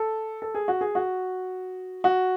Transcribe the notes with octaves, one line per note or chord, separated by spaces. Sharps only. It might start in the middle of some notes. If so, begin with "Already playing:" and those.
Already playing: A4
A4
G#4
F#4
G#4
F#4
F#4